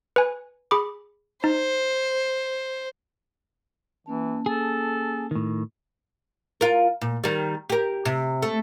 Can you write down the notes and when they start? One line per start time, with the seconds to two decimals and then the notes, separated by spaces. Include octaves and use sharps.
0.16 B4 G#5
0.71 G#4 B5 D6
1.44 D#4 C5
4.06 E3 A#3 C#4 A5
4.46 G#4 A4
5.31 A2 D#3
6.61 F4 A#4
7.01 A#2
7.24 D#3 G3
7.70 G4 A#4
8.05 C3
8.42 A3